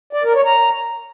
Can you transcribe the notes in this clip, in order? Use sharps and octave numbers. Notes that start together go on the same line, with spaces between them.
D5
A#4
C#5
A#5